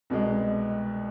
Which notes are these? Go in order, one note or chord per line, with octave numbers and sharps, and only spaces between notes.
C2 B2 G#3